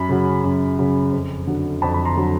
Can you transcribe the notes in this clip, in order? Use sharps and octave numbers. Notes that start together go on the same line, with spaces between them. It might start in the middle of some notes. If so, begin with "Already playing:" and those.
Already playing: F#2 B5
C#3 F#3
F#2
C#3 F#3
F2
D3 F#3
F2 A5 B5
B5
A#5 C6
D3 F#3